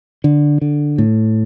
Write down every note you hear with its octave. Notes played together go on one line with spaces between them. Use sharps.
D3
D3
A2